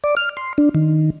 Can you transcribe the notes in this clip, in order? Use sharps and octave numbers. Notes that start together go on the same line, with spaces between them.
D5
F6
C6
D4
D#3